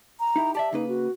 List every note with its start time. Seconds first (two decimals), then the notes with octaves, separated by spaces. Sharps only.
0.19 A#5
0.36 D#4 E4 G4
0.55 G4 D5 E5 A5
0.72 C#3 A#3 D#4 B4
0.88 F#4